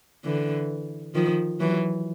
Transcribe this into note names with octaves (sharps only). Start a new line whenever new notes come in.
D3 E3
D#3 F3
E3 F#3